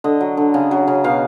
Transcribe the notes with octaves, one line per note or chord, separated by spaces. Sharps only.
D3 D#5
F#3
D3
C#3
F#3
C#3
B2 F5